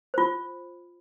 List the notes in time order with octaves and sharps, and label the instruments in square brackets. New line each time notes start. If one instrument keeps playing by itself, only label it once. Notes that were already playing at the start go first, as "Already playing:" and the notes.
[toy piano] F4 C5